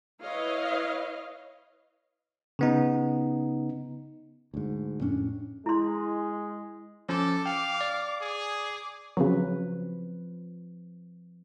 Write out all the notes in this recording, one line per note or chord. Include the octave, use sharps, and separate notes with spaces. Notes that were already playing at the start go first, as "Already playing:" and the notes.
E4 B4 C#5 D#5 F5
C#3 B3 D#4
D2 G#2
F2 A2 C#4 D4
G#3 E4 C6
F3 C#4 A4 D6
F5 G5
D5
G#4
D6
C#3 F3 F#3 C4 B4